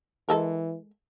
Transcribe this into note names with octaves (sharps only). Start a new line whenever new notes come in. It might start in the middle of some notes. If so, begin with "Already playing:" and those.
E3 G#3 A4 A#4